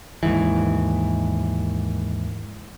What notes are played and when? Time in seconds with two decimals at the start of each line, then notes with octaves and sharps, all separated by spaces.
0.23 D#2 G#2 E3